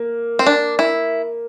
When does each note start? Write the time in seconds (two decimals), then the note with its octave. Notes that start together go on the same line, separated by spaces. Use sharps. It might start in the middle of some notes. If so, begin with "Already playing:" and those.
Already playing: A#3
0.39 C4
0.47 D4
0.79 E4